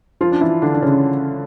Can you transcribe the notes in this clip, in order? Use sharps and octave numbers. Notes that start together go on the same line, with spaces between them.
F3 F4
D4
E3 E4
D3 D4
D4
C#3 C#4